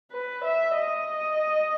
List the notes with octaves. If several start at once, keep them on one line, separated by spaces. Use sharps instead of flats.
B4
E5
D#5